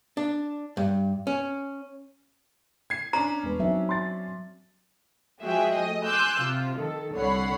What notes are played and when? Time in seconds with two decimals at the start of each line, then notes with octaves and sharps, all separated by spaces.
0.17 D4
0.77 G2
1.27 C#4
2.90 G#6 C7
3.13 C#4 D4 A#5
3.43 E1 B4
3.59 F#3 C4 D#4 E5
3.89 C6 A6
5.42 F3 G#3 F#4 G#4 E5 G5
5.74 A3 D#5
6.04 G#5 C6 D6 E6 F#6 G6
6.39 C3 F4
6.76 D#3 A4
7.15 C2 D3 C#5 F#5 B5 C7